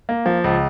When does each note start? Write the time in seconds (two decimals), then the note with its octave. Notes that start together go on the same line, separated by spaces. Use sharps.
0.09 A#3
0.26 F3
0.44 C#2